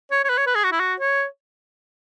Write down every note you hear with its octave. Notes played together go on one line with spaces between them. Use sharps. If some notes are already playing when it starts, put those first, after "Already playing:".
C#5
C#5
B4
C#5
B4
G#4
F#4
E4
F#4
C#5